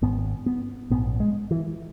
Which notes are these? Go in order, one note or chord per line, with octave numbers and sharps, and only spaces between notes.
G#1 G#2 B3
B3
A#1 G#2 B3
G#3
E3